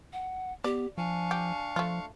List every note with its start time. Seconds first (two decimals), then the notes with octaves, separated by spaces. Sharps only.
0.13 F#5
0.64 B3 G4 D5
0.98 F3 D4 F5 G#5 C#6
1.31 G4
1.76 F3 A3 F4